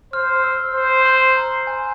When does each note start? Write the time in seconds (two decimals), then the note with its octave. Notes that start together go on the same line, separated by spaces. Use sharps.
0.13 C5 F6
0.44 E6
0.75 C5
1.05 C6
1.22 C6
1.37 A#5
1.67 G#5